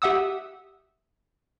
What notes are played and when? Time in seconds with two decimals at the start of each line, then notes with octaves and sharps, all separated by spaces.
0.02 G4 E5 F#5 D#6 E6